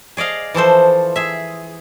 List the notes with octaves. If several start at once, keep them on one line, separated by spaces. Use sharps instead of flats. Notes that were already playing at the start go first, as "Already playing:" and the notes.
G#4 D5 D#5 F5
E3 F3 A4 C5
G#4 E5